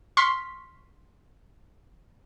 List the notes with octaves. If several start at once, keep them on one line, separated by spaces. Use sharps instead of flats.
C6 C#6 F6 B6